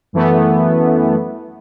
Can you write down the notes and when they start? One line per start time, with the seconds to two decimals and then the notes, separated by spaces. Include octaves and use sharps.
0.13 F#2 E3 A3 B3